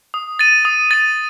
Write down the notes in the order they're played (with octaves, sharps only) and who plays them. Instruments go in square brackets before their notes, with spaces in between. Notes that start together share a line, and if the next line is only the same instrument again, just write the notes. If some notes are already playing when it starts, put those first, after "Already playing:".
[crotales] D#6
A6 D#7
D#6
A6 D#7